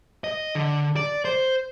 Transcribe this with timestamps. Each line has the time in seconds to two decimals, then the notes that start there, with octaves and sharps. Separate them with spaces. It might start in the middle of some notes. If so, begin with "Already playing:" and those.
0.24 D#5
0.55 D3
0.96 D5
1.25 C5